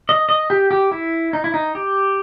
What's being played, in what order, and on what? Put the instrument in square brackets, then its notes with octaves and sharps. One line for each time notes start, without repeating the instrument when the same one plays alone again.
[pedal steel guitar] D#5
D#5
G4
G4
E4
D#4
E4
D#4
G4